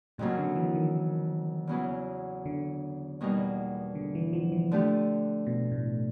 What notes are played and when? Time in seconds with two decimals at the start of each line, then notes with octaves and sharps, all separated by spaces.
0.18 F2 A2 C#3 F#3 A#3
0.38 D3
0.56 E3
0.75 D#3
1.67 E2 C#3 F#3 B3 E4
2.45 D3
3.21 E2 B2 G3 A#3 D#4
3.95 D3
4.15 E3
4.33 F3
4.52 E3
4.71 D3 F3 A3 D4 G4
5.47 B2
5.71 A2